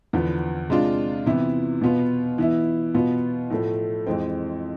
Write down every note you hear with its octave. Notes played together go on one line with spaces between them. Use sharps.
E2 D3 F3 B3
C3 G#3 D4 F4
C3 E3 B3 E4
B2 B3 F4
E3 B3 E4
B2 B3 F4
A2 F3 A3
F2 E3 G#3 C4